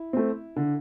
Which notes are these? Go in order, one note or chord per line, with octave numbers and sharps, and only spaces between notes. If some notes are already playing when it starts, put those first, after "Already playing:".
Already playing: E4
A3 C4
D3